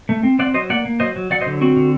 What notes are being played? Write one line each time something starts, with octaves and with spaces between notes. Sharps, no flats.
A3
C4
C4 D5 F#5
F#3 C5 D#5
A#3 D5 F#5
A#3
F#3 C5 D#5
F#3
F#3 D5 F#5
C5 D#5
D3
C4 F#4
D3